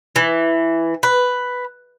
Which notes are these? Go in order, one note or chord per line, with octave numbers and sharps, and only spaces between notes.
E3
B4